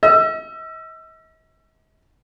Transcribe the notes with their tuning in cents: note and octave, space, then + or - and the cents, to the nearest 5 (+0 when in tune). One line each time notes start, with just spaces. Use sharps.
D#5 +45 E6 +30